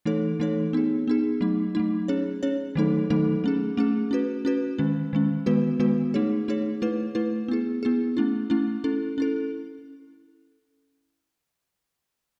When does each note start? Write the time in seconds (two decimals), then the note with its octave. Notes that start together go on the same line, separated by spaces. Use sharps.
0.05 E3 A3 D#4 A4 C#5
0.40 E3 A3 D#4 A4 C#5
0.73 B3 D#4 G#4
1.08 B3 D#4 G#4
1.41 F#3 A3 D#4
1.75 F#3 A3 D#4
2.08 C#4 G#4 C#5
2.43 C#4 G#4 C#5
2.75 D#3 F#3 A3 D#4 A4
3.10 D#3 F#3 A3 D#4 A4
3.44 A3 C#4 G#4
3.77 A3 C#4 G#4
4.11 C#4 F#4 B4
4.45 C#4 F#4 B4
4.78 D#3 G#3 C#4
5.13 D#3 G#3 C#4
5.46 D#3 G#3 B3 F#4 B4
5.80 D#3 G#3 B3 F#4 B4
6.14 A3 D#4 G#4 C#5
6.48 A3 D#4 G#4 C#5
6.82 A3 E4 B4
7.15 A3 E4 B4
7.48 B3 E4 G#4
7.83 B3 E4 G#4
8.17 A3 C#4 E4
8.50 A3 C#4 E4
8.84 C#4 E4 A4
9.18 C#4 E4 A4